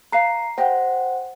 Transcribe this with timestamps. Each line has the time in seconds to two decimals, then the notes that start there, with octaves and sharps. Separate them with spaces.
0.12 B4 F5 A#5 C7
0.58 G4 C5 D#5 F#5 G5